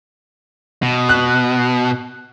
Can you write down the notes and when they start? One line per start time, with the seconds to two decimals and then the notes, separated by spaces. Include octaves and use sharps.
0.82 B2
1.09 F#6